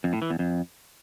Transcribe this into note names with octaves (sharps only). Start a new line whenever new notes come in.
F2
A2
E3
E2
F2